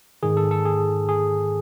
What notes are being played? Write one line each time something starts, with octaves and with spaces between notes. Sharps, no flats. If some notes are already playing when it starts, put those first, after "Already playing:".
G#2 D#3 G#4
A4
A4
G#4
G#4